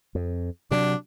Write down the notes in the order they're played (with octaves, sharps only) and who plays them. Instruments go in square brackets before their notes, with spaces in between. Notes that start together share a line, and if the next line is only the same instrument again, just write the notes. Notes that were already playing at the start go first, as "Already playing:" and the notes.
[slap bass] F2
[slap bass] C3 F#3 [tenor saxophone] D4